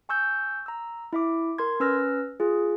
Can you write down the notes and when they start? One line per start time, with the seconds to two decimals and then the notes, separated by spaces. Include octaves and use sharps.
0.09 G#5 C#6 E6 G6
0.66 A#5 E6
1.13 E4 E5 D6
1.58 A#4 C6 G#6
1.80 C#4 B4 E6 F6 A#6
2.40 F4 G#4